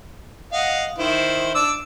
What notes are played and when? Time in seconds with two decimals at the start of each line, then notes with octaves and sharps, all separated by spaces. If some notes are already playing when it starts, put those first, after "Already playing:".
0.53 D#5 F5 F#5
0.98 D#3 E4 C5
1.55 D4 D6 E6